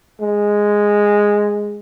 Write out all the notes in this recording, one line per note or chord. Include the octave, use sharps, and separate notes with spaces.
G#3